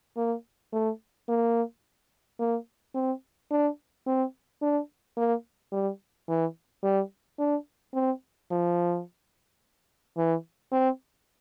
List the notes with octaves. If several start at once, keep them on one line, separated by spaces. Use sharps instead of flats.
A#3
A3
A#3
A#3
C4
D4
C4
D4
A#3
G3
E3
G3
D4
C4
F3
E3
C4